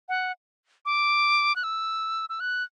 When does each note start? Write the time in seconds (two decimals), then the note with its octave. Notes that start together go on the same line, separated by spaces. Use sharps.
0.09 F#5
0.86 D6
1.56 F#6
1.64 E6
2.29 E6
2.40 F#6